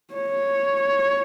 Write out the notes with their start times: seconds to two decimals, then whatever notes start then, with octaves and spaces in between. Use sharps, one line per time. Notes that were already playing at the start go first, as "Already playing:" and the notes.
0.14 C#5